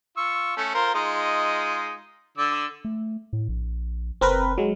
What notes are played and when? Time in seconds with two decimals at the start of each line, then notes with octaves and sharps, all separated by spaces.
0.17 F4 C#6 E6
0.57 A3 C#4
0.75 F4 A#4 C5
0.95 G#3 D#4 F4
2.38 D3 D5 E6
2.85 A3
3.33 A2
3.49 A#1
4.21 F#1 C4 A#4 B4
4.58 F#3 G#3